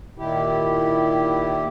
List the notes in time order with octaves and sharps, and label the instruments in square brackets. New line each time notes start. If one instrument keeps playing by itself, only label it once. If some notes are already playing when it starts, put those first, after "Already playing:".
[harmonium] A#2 D#3 E4 G4